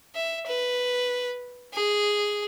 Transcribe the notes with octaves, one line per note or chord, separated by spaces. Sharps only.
E5
B4
G#4